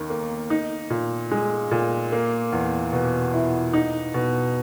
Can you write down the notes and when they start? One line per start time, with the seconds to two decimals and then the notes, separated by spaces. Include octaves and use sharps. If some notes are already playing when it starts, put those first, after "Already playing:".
Already playing: D#2 D#3
0.10 A#3
0.50 D#4
0.90 A#2
1.31 G#3
1.71 A#2
2.12 A#3
2.53 E2
2.93 B2
3.34 E4
3.73 D#4
4.14 B2